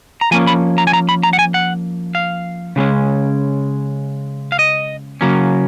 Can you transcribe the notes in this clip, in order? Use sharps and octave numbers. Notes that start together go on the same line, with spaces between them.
A#5
F3 A#3 C#4 G#5
B5
A#5
G#5
A#5
B5
A#5
F#5
G#5
F#5
F5
C#3 G#3 C#4
F5
D#5
C#3 F#3 A#3 C#4